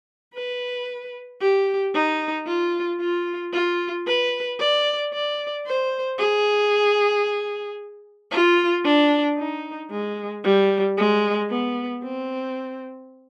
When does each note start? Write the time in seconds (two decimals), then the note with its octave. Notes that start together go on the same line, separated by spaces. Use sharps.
0.34 B4
1.41 G4
1.94 D#4
2.46 F4
3.00 F4
3.53 F4
4.06 B4
4.59 D5
5.13 D5
5.65 C5
6.18 G#4
8.31 F4
8.84 D4
9.37 D#4
9.90 G#3
10.43 G3
10.97 G#3
11.49 B3
12.03 C4